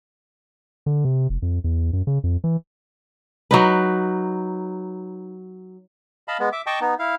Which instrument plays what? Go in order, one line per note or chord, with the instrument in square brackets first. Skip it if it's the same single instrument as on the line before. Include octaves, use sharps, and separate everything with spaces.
[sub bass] D3
C3
F1
F2
E2
F#2
C#3
F2
E3
[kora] F#3 D#4 B4
[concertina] D#5 F5 A5 B5
G#3 B3
E5 D6
D#5 G5 A5 C#6 D6
B3 D#4
E4 F5